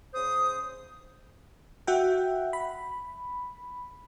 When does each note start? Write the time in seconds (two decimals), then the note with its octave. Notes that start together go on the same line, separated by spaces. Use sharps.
0.13 C#3 C5 D#6
1.87 F#4 E5 F#5 G5
2.53 B5